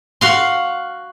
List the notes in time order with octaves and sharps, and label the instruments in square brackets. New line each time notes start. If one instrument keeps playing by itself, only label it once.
[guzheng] F#4 F5 C6